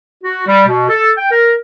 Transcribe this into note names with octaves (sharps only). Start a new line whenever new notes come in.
F#4
G3
B2
A4
G5
A#4